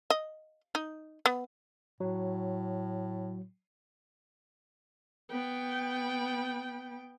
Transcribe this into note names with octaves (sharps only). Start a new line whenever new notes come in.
D#5
D#4
B3
A2 F#3
B3 G5